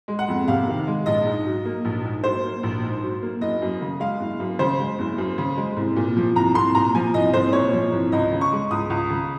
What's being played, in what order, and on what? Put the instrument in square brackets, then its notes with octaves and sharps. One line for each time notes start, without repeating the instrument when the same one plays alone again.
[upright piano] G#3
F#5
F2
C3 F5
D#3
G#3
A#1 D#5
G#2
F#3
A#3
A#1
G#2
F#3 C5
A#3
A#1
G#2
F#3
A#3
F#1 D#5
F#2
C#3
G#3 F5
F#1
F#2
C#3 C5
G#3
F#1
F#2
C#3
G#3
C2
A#2
F3
C2 A#5
C2 C6
A#2 A#5
F3 G#5
C2 D#5
C2 C5
A#2 C#5
F3
C2
C#2 D#5
C#3
C#6
G#3
C#2 D#6
C#2
C#3